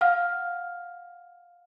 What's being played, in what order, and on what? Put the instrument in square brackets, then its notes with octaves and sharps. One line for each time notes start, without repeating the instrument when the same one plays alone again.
[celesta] F5 F#5 F6